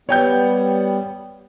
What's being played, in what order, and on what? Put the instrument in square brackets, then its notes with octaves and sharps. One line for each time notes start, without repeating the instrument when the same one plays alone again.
[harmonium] G3 B3 [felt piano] C#5 G5 G6